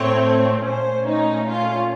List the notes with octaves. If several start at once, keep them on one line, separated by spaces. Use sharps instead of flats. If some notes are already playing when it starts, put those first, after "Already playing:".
Already playing: A2 A3 C4 C#5
A#2 A3 C#4 C5
D#4
F4